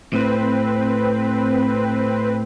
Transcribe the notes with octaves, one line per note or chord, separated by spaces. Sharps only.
A2 C4 B4